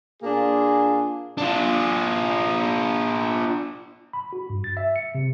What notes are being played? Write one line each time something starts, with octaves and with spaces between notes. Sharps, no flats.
A#2 A#3 D4 F4 G#4
D4 F4
B5
F#4
G2
A6
E5
C#7
C3